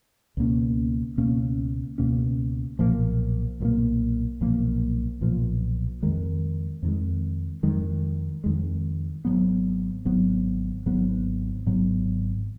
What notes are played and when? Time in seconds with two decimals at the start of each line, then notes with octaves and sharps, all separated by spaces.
0.37 C#2 B2 A#3 C#4
1.17 C#2 B2 A#3 C#4
1.98 C#2 B2 A#3 C#4
2.79 B1 A#2 F3 A#3
3.60 B1 A#2 F3 A#3
4.41 B1 A#2 F3 A#3
5.21 B1 A#2 F3 A#3
6.03 F2 D#3 G#3
6.83 F2 D#3 G#3
7.63 F2 D#3 G#3
8.44 F2 D#3 G#3
9.25 G#1 G#2 F#3 B3
10.05 G#1 G#2 F#3 B3
10.86 G#1 G#2 F#3 B3
11.66 G#1 G#2 F#3 B3